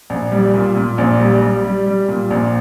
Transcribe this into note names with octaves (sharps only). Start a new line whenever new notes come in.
A#1
G3
A#2
A#2
A#1
G3
G3
G3
G3
A#2
A#1